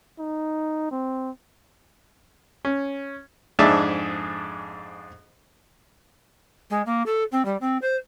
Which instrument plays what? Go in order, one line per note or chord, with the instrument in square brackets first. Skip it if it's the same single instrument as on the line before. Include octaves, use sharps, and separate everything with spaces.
[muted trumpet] D#4
C4
[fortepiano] C#4
F2 G#2 D4 G#4 E5 A5
[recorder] G#3
A#3
A4
C4
G3
C4
C5